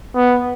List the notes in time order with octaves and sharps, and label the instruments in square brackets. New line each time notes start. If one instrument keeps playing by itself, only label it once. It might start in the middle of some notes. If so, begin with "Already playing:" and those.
[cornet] B3